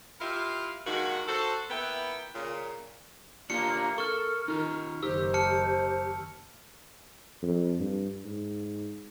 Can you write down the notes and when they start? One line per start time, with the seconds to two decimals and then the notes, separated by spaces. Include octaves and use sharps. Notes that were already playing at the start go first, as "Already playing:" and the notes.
0.20 E4 F4 G4 A#4 E5 F5
0.86 G2 D#3 G#3 A#3 F#4
1.28 F#4 A4 C5
1.70 A#3 B3 E4 B4 G5
2.34 A#2 C#3
3.50 A#3 D4 F4 G4 C#7
3.98 A4 A#4 C#6 F6
4.48 D#3 D#4 F4
5.03 F#1 D#3 G4 C5 E6
5.34 A5 F6 C#7
7.43 F2
7.80 G2
8.25 G#2